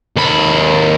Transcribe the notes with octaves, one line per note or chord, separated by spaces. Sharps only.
D#2 B5